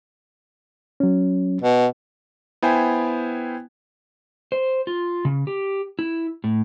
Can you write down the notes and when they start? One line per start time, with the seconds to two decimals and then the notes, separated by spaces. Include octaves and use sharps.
1.00 F#3 C#4
1.62 B2
2.62 B3 E4 C5 G5 G#5
4.52 C5
4.87 F4
5.25 C#3
5.47 G4
5.99 E4
6.44 A2